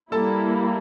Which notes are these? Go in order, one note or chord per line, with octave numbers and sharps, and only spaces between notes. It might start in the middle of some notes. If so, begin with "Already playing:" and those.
G3 A#3 E4 A4 A5